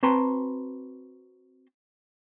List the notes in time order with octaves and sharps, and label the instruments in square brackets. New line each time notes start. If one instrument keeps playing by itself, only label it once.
[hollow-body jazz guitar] C4 F#4 B4 A5 A#5 C6